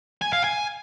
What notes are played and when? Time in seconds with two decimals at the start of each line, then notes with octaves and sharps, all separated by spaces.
0.22 G#5
0.33 F5
0.44 G#5